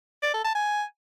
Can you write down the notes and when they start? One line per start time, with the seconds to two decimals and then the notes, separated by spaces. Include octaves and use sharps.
0.23 D5
0.34 A4
0.44 A5
0.55 G#5